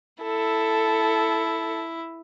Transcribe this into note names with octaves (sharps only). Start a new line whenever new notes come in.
E4 A4